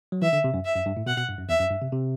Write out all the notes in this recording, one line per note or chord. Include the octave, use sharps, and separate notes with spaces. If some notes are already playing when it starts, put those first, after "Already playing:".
F#3
E3 E5
D3
C3
F#2
E5
F#2
G2
A2
B2 F#5
B2
G2
F#2
E2 E5
F#2
G2
C3
C3